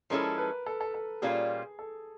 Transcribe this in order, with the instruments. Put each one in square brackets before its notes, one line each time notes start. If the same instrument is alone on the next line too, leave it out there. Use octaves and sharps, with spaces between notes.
[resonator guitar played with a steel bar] F3 G#3 C#4 E4 A4 [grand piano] A#4
[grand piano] B4
A4
A4
A4
[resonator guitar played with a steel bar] A#2 G3 A#3 C#4 F4 [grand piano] G#4
[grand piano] A4